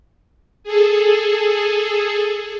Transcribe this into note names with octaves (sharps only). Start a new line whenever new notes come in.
G#4 A4